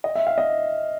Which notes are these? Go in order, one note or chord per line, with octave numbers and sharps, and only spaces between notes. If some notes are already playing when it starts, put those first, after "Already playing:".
D#5
E5
F5
D#5